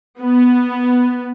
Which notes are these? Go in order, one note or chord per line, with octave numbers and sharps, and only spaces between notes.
B3